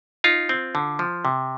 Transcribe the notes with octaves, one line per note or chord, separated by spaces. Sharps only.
D#4 F4
C4
D3
F3
C3